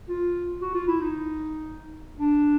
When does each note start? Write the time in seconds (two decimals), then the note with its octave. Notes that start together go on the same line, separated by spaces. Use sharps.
0.09 F4
0.61 F#4
0.74 F4
0.87 E4
1.00 D#4
2.19 D4